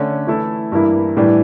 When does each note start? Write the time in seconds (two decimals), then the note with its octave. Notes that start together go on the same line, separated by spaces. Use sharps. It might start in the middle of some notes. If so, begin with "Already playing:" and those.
Already playing: D3 A3 C#4
0.27 E3 A3 E4 A4
0.72 G2 E3 A#3 E4
1.17 A2 E3 G3 D4